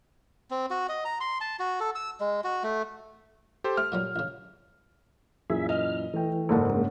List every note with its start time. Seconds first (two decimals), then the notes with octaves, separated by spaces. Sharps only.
0.51 C4
0.70 F#4
0.89 D#5
1.05 A#5
1.21 C6
1.41 A5
1.59 F#4
1.80 A4
1.95 E6
2.20 G#3
2.44 F#4
2.64 A3
3.64 G4 A4 C5
3.77 A3 F6
3.92 A#2 F#3 G3
4.16 A1 C#3
5.50 F#2 A#2 E3 G#4 E5
5.69 D#5 F6
6.14 E3 A3 G5
6.49 F#1 G#2 A4 A#4 D5 F#5
6.70 G#3 A#3 C#4 D4